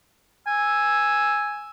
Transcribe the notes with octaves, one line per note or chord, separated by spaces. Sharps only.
G#5 E6